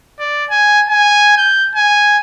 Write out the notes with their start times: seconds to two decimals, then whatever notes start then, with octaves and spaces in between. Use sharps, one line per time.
0.20 D5
0.50 G#5
0.89 G#5
1.37 G6
1.75 G#5